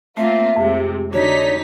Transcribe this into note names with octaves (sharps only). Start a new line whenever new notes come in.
A3 A#3 C4 F4 E5
F2 C3 G#3
D3 D#4 F#4 C#5 B6